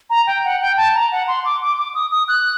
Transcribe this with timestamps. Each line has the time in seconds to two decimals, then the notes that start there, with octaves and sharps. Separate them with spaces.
0.10 A#5
0.27 G5
0.45 F#5
0.61 G5
0.77 A5
0.95 A#5
1.12 F#5
1.28 C6
1.45 D6
1.62 D6
1.78 D6
1.95 D#6
2.11 D#6
2.28 F#6